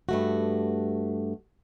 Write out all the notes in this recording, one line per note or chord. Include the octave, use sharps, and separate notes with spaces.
G2 A3 F#4